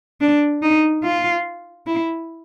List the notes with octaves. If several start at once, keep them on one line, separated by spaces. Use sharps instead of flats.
D4
D#4
F4
E4